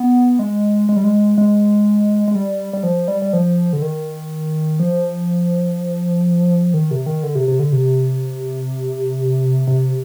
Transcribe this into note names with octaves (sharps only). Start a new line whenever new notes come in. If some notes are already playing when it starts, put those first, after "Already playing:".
Already playing: B3
G#3
G#3
G3
G#3
G#3
G#3
G3
G3
F3
G3
G3
F3
D3
D#3
F3
D#3
C3
D#3
D3
C3
C3
D3
C3
C3